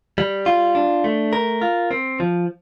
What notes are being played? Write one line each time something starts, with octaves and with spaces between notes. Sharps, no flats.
G3
F4
D4
A3
A#4
F4
C4
F3